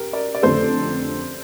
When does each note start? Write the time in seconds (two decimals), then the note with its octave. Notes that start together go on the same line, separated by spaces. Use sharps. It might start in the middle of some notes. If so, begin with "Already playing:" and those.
Already playing: G4 A#4
0.13 A#4 D5
0.35 D5
0.43 F2 D3 A3 A4 C5